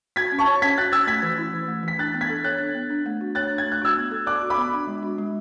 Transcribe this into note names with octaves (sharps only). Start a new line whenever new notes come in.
F#4 G#6 B6
C#4
A5 C#6
C#5
C#4 G#6 B6
F#4 F#6 A6
C#4 E6 G#6
A3 G#6 B6
E3
E4
E3
A3
E3 B6
D4 F#6 A6
B3
G#6 B6
A4
C#5 F#6 A6
D4
B3
D4
A3
F#4
C#5 F#6 A6
D4
G#6
A3
F#6
F#4 E6 G#6
B3
A4
D5 D6 F#6
F#4
B5 D6
B3
D4
G#3
F#4
G#3